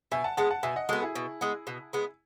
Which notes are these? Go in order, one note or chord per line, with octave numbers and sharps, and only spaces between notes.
B2 E5 G#5
F#5 A5
G#3 B3 F#5 A5
F#5 A5
B2 E5 G#5
D#5 F#5
G#3 B3 F#4 A4
E4 G#4
B2
G#3 B3
B2
G#3 B3